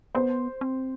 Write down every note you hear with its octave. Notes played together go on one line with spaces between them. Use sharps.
B3 C5
C4